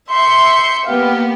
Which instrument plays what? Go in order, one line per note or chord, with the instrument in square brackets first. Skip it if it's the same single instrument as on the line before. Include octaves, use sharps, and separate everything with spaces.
[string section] E5 G6 C#7 [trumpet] C6
[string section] A#3 B3 G4 [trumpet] F5